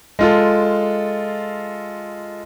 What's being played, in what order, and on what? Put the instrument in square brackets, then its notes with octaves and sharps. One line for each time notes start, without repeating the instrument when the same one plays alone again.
[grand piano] G#3 F4 A4